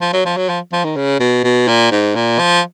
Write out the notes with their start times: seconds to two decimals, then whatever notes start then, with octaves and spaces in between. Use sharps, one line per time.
0.01 F3
0.13 F#3
0.25 F3
0.37 F#3
0.49 F3
0.72 F3
0.85 D#3
0.96 C#3
1.20 B2
1.44 B2
1.68 A#2
1.91 G#2
2.15 A#2
2.39 F3